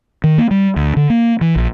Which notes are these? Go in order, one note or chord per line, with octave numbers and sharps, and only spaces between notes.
D#3
A#3
G3
D2
D3
A#3
E3
A#1